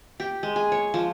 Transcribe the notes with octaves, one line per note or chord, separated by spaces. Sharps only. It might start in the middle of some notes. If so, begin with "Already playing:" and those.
G4
G#3
G#4
C#5
F3